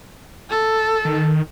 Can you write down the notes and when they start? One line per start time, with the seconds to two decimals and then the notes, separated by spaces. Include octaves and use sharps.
0.50 A4
1.05 D#3